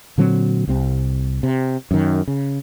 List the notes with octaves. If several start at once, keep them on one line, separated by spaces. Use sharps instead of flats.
A#2 D3 F#3 C4
C2 C3 C4
C3
F#2 D#3
C#3